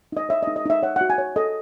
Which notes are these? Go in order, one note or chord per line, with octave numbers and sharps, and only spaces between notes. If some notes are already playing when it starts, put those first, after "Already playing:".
D#4 D#5
C#5 E5
D#5
D#4
D#5
D#4 E5
C#5 F#5
F#5
F#4
G#5
C#5
A4 D#5